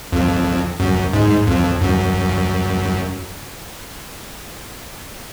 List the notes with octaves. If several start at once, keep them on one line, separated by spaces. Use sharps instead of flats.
F2
F#2
G#2
F2
F#2